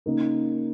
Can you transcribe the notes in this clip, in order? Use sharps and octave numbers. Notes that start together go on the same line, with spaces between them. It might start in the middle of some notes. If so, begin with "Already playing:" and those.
C#3 A#3 D#4 A#4